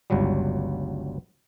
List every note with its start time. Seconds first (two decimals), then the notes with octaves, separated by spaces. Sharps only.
0.10 G1 C#2 F#3 G3